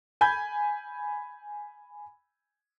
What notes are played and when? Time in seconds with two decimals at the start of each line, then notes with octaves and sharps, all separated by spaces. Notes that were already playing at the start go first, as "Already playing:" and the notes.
0.21 G#5 B5 G6 G#6